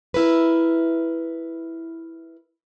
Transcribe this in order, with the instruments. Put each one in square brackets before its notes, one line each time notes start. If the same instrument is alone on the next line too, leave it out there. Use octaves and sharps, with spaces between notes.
[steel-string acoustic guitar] E4 A#4 B4